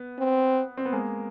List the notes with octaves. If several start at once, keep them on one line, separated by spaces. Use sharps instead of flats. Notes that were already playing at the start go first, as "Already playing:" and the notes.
Already playing: B3
C4
C4
B3
G#3 A#3